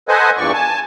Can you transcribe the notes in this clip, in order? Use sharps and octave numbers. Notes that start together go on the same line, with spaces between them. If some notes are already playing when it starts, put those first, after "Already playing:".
A4 B4 C5 D#5 F#5 G#5
E2 G2 A#2 D5 C#6
G#5 A5